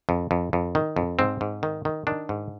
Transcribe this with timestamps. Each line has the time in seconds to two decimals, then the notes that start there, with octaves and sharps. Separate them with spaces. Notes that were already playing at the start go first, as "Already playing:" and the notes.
0.09 F2
0.31 F2
0.53 F2
0.75 D#3
0.96 F2
1.19 G#2 C4
1.41 G#2
1.63 D#3
1.85 D#3
2.07 D#3 D4
2.29 G#2